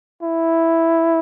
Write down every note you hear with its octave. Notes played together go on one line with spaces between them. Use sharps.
E4